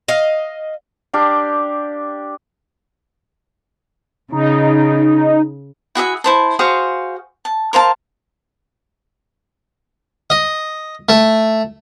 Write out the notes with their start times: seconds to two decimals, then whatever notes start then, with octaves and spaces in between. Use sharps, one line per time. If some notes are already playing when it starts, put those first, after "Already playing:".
0.08 D#5 F5
1.13 D4 G4 F5 D6
4.32 C#3 D#4
5.95 E4 F#4 G#4 E5
6.24 E4 C5 A5
6.59 F#4 G#4 C5 F5
7.45 A5
7.73 A#4 C5 F5 A5
10.30 D#5
11.09 A3